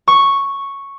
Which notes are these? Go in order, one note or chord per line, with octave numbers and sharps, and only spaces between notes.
C#6